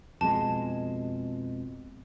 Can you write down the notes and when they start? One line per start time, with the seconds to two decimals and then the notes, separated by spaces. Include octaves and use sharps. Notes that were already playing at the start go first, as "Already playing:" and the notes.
0.21 F2 B2 G#3 A5